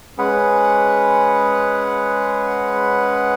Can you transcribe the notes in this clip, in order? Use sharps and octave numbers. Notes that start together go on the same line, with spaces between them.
G#3 C#4 G#4 B4 F#5